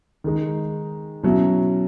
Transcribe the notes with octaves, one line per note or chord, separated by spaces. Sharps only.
D#3 G#3 D#4
B2 F#3 C#4 E4